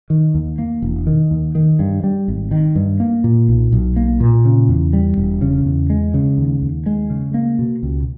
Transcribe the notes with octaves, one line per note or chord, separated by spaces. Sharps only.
D#3
D#2
A#3
E1
D#3
D#2
D#3
G2
G3
G#1
D#3
G2
A#3
A#2
B1
B1
A#3
A#2
C#3
E2
G3
E1
C#3
E2
G#3
C#3
D#2
D#2
G#3
C#3
A#3
B2
C#2